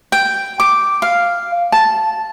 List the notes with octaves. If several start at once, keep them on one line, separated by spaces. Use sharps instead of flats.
G5
D6
F5
A5